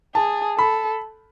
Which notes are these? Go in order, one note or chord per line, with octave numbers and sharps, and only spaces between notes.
G#4 A5
A4 B5